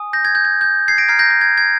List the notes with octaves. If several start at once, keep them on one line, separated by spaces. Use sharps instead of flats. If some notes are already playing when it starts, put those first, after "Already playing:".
Already playing: G#5 D#6
G6 A#6
G#6
G6
G#6
G6
G#6 C7
A#6 D7
A#5 F6 G#6 C7
G6 A#6
G6
G#6
G#6